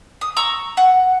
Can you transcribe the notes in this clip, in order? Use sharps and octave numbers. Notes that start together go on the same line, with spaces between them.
D#6
A#5 C#6 E6
F#5